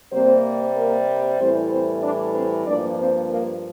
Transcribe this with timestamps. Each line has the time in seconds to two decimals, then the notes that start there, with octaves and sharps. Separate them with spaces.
0.12 C3 G3 A#3 C4 C5
0.76 A#3 A#4
1.39 A2 E3 G3 C4 C5
1.71 C4 C5
2.03 D4 D5
2.35 C4 C5
2.67 G2 F3 A#3 D4 D5
2.99 C4 C5
3.30 A#3 A#4